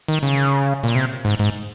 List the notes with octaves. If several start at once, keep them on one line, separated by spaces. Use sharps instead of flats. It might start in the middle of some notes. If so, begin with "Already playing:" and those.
D#3
C#3
A#2
C3
G#2
G#2